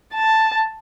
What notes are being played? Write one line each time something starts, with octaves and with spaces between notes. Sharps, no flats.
A5